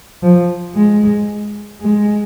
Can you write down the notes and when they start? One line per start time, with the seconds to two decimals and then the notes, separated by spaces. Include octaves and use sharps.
0.23 F3
0.75 G#3
1.81 G#3